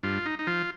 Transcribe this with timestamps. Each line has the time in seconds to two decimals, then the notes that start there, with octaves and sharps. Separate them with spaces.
0.03 G2 F4
0.26 D#4
0.39 D#4
0.47 F3 F4